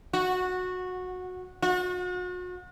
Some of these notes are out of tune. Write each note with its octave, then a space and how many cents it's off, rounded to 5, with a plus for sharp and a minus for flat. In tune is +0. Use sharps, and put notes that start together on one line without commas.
F#4 -15
F#4 -40